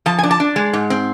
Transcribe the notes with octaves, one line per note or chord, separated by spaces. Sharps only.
F3 A5
G#5
D4
A5
D4
G#3
G#2
C4